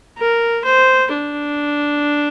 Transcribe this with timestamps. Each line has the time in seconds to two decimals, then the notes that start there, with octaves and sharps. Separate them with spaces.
0.18 A#4
0.65 C5
1.13 D4